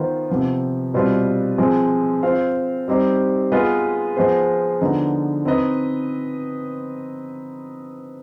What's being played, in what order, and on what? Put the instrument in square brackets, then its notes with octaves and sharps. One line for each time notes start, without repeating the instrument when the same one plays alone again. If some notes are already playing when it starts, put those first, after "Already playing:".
Already playing: [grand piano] D#3 B3 F4 C5
C3 F3 B3
B2 G3 C4 F4 B4
F3 G#3 C4
C4 F4 C5 F5
G3 C4 D#4 G4 C5
G#3 B3 F4 B4 D#5
F3 G#3 B3 F4 C5
D3 F3 B3 D#4
C4 D#4 B4 D#5